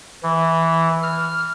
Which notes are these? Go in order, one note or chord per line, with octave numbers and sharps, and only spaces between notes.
E3
F6